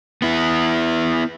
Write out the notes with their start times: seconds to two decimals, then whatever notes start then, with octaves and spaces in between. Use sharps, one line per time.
0.22 B3 E4